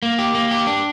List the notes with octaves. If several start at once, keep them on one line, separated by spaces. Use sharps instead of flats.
A#3
G4
A#3
G4
D4